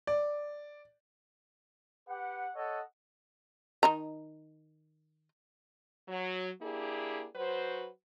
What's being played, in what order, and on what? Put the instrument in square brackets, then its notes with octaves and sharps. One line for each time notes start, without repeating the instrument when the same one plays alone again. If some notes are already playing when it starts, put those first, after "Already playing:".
[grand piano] D5
[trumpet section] G4 B4 F#5
A4 C#5 D#5 F#5
[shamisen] D#3 D#4 A#5
[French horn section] F#3
A#3 D4 E4 G4 G#4
F#3 F#4 B4 C5